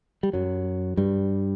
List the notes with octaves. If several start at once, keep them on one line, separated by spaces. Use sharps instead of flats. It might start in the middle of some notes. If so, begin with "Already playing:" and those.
G3
F#2 F#3
G2 G3